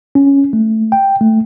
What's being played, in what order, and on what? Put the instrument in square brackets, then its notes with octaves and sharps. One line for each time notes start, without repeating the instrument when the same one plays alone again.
[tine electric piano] C#4
A3
G5
A3